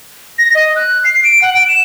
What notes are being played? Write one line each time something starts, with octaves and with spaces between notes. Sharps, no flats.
A#6
D#5
F#6
C7
D7
F#5
D7
E7